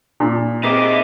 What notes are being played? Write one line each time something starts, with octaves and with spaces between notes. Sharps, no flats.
A#2
A#3 C4 D#4 G#4 B4 E5 D6